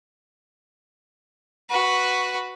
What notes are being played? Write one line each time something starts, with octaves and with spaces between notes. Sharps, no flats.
F#4 B4